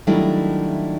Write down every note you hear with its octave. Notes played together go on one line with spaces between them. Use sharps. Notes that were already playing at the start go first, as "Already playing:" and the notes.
D#3 F#3 G3 A3 D4 E4